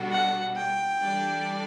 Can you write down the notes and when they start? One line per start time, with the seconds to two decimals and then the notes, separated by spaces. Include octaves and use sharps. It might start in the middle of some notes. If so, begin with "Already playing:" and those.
Already playing: B2 G3 D4 F#4 A4
0.11 F#5
0.56 G5
1.00 E3 G3 D4 A4 D5